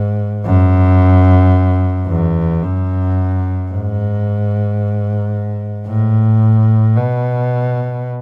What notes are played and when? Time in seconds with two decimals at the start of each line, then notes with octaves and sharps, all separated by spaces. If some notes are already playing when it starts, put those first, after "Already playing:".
Already playing: G#2
0.44 F#2
2.07 E2
2.62 F#2
3.70 G#2
5.87 A2
6.96 B2